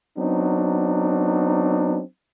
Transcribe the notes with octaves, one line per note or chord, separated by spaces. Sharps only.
F#3 B3 C4 D4 D#4